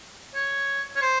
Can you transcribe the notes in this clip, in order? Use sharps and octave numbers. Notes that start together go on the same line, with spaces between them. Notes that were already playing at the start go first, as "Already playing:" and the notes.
C#5
C#5
C5